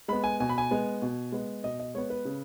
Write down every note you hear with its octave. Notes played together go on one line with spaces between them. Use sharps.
G#3 B3 B5
G#5
B2 G#5
B5
G#5
G#3 B3
B2
G#3 B3
B2 D#5
D#5
G#3 B3 C#5
B4
C#3